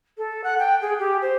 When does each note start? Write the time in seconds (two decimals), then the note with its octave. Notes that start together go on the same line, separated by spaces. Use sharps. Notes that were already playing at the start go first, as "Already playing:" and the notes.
0.18 A4
0.44 F#5
0.59 G5
0.82 G#4
0.99 G4
1.22 C5